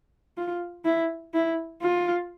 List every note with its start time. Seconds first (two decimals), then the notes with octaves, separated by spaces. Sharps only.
0.37 F4
0.85 E4
1.34 E4
1.82 F4